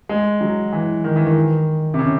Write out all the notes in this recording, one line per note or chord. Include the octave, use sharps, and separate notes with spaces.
G#3
F#3
E3
D#3
E3
D#3
C3
C#3